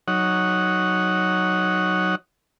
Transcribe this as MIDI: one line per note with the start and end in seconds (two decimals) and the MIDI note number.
0.08 2.15 54
0.08 2.15 63
0.08 2.15 73
0.08 2.15 78